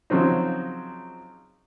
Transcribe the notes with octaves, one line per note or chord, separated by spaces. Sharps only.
C#3 F3 F#3 C4 D#4